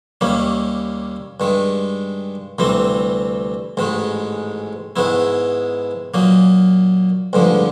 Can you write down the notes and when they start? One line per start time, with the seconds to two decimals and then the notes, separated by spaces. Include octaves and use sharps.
0.21 D#2 D#3 G3 A#3 C#4
1.40 G2 D#3 G#3
2.59 D2 C3 E3 G3 C4
3.77 A1 G#2 D#3 G#3
4.96 G#2 D#3 G#3 B3 E4
6.14 A#2 F#3 A#3 D#4
7.33 A1 G2 D3 F3 G#3